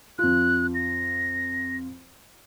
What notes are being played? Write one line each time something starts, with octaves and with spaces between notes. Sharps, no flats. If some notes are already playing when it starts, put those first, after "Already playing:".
F2 F4 F#6
A#6